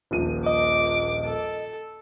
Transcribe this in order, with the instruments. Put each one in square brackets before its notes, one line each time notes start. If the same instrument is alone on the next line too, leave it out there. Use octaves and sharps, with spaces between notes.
[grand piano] D#1 A#1 D#7
[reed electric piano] D#5 [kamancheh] D6
[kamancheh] A4